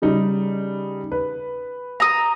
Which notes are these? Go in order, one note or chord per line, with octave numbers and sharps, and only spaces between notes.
C#3 G3 D#4
B4
A#5 D#6